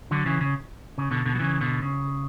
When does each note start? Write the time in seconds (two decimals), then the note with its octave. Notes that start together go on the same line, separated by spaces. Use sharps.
0.11 D3 F#3
0.26 C#3 E3
0.41 C#3
0.98 C#3
1.11 B2 D3
1.25 B2 D3
1.35 F#3
1.39 C#3 E3
1.61 B2 D3
1.82 C#3